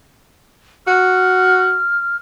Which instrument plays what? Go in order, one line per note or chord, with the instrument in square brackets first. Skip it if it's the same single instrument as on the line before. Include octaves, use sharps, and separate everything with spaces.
[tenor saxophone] F#4 [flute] F6